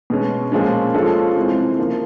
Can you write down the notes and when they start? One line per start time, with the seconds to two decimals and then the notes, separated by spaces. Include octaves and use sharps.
0.10 B2 G#3 C#4
0.52 A#2 F3 G#3 C#4
0.94 F3 G#3 C#4 F4 A4
1.36 C3 E3 G#3 C4
1.78 C#3 F3 A#3